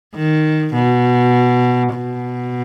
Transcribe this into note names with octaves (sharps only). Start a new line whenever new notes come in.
D#3
B2
B2